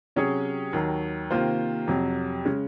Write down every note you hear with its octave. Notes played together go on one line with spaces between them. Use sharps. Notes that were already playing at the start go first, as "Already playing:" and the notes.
C3 F#3 C#4 G#4 C#5
D#2 D#3 F#3
C3 D#3 A#3 F4 C5
F2 C3 F#3
C#3 G#3 C#4